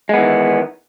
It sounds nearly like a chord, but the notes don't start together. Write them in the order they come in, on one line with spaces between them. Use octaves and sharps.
G#3 B3 E3 D#3